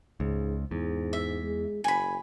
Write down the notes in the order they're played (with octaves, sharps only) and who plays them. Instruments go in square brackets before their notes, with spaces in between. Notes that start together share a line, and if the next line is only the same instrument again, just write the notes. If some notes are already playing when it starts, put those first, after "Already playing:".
[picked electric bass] C#2 [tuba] G#2
[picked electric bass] E2 [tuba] G#2
[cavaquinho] E5
[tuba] G#3
[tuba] F#1 [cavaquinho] G#5 B5